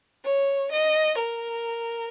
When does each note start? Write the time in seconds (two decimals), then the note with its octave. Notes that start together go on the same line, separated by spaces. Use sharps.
0.25 C#5
0.72 D#5
1.18 A#4